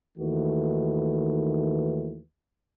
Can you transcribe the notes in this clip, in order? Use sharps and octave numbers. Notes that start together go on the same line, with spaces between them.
D#2 D#3 E3 A3 F#4 B4